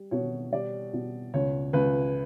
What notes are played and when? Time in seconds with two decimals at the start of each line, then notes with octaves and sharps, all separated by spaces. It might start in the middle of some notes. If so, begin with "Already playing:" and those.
Already playing: G3
0.11 B2 C#5
0.52 G3 D5
0.93 B2
1.34 C#2 C#5
1.73 C#2 B4